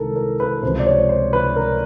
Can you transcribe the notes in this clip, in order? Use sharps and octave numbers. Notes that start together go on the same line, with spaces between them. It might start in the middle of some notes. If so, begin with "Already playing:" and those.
Already playing: C2 C3 D#3 G#3 A4 A#4
A#4
B4
C#2 C3 F3 C5
D5
C#5
C5
B4
A#4